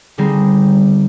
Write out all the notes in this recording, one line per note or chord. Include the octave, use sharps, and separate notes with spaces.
D3 G3 C4 D#4 G#4